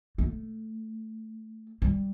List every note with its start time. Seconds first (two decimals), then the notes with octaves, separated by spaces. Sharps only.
0.18 A3
1.82 G3